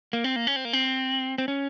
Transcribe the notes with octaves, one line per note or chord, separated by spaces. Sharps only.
A#3
C4
A#3
C#4
C4
A#3
C4
C4
C#4